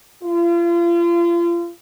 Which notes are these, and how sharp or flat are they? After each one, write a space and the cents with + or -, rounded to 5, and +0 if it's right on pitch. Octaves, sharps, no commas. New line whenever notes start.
F4 -35